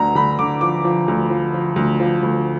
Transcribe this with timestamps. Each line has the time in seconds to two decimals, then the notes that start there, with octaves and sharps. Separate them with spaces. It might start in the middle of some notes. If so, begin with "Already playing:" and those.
Already playing: D2 D3 A#5
0.15 D2 B5
0.39 D3 D6
0.61 F3 D6
0.85 F3
1.08 D2
1.30 F3
1.54 F3
1.76 D2
2.00 F3
2.23 D2